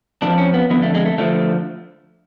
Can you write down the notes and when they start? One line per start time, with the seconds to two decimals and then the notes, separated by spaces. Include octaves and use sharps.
0.22 F2 D3 F3 D4
0.38 C#4
0.54 B3
0.70 F2 D3 F3 B3
0.82 A3
0.95 G#3
1.06 A3
1.18 D3 F3 A3